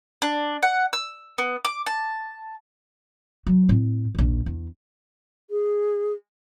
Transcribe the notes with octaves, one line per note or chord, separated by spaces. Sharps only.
D4
F#5
E6
B3
D6
A5
F#3
A2 C4
A#1 D#2
E2
G#4